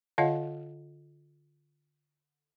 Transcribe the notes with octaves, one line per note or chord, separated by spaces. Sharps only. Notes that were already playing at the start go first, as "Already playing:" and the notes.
D3 F4 C#5 D#5 F5 F#5